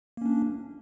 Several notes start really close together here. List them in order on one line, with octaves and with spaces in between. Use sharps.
A#3 C#4 D4